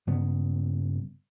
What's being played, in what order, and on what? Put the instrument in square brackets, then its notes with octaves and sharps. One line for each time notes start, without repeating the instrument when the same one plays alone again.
[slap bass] G2 C#3 B3